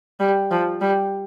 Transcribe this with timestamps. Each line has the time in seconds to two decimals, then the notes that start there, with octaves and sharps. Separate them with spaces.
0.20 G3
0.51 F3
0.81 G3